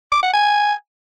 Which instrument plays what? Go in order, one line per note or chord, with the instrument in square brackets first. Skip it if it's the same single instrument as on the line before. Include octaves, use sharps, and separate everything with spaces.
[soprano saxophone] D6
F#5
G#5